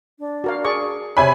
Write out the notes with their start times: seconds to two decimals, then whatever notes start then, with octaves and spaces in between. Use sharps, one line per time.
0.19 D4
0.44 F#4 A#4 F5
0.65 G#4 D5 C#6
1.17 C3 C#5 G#5 B5